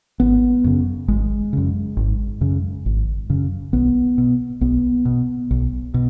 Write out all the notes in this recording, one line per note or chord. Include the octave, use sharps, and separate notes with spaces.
G#1 B3
F#2 C#3
G#1 G#3
F#2 C#3
G#1
F#2 C#3
G#1
F#2 C#3
B1 B3
B2
B1 B3
B2
B1
B2